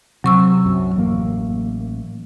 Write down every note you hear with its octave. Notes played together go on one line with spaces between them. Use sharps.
C3 F#3 C#6 E6
C2 F#2
A1 A#3